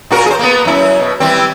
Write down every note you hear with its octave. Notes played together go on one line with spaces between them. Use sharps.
A#2 F#4 A#4
G#4 C5
A#3 B3
F#2 E4
B2
E3 G3 C4